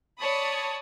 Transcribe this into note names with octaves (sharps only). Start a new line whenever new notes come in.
C#5 D5 A5 B5 D#6